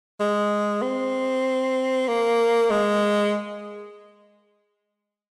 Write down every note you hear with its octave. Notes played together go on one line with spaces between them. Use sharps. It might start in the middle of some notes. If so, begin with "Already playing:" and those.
G#3
C4
A#3
G#3